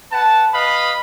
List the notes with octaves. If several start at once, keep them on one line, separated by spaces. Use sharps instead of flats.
B4 F#5 A5
B4 D#5 F5 B5